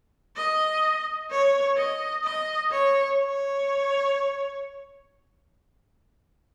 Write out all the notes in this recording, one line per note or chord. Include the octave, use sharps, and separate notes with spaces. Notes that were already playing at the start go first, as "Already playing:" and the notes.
D#5
C#5
D#5
D#5
C#5
C#5